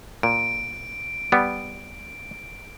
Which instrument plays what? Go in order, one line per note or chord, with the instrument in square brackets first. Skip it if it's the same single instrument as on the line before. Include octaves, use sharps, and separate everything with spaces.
[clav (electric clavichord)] A#2 [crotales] D7
[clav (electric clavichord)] G3 B3